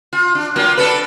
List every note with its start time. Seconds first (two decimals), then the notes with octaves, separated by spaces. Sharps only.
0.13 F4
0.35 D4
0.56 F#3 A#3 F4
0.77 D4 A4 B4